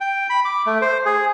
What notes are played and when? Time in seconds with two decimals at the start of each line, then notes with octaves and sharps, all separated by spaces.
0.01 G5
0.30 B5
0.45 D6
0.66 A3
0.82 C5
1.06 G#4